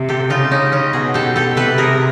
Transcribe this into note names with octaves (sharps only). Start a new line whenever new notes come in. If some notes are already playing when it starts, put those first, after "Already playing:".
Already playing: C3
G4 A4
C#3 D#4 F4
C#4 D#4
C#4 D#4
B2 F#4 G#4
G4 A4
G4 A4
C3 A4 B4
G#4 A#4